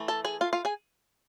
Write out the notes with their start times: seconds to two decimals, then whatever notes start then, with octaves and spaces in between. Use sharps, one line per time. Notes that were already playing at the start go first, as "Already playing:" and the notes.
Already playing: E3 A3
0.08 A4 A5
0.25 G#4 G#5
0.41 F4 F5
0.53 F4 F5
0.65 G#4 G#5